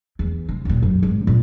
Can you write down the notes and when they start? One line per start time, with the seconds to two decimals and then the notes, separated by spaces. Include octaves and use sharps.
0.19 E2
0.49 C3
0.65 D#2 A#2
0.83 F#2
1.03 G#1
1.27 A#2 C#4